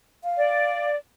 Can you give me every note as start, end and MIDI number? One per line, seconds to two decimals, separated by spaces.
0.24 0.89 77
0.37 0.97 74